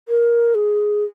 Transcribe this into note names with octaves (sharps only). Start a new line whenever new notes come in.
A#4
G#4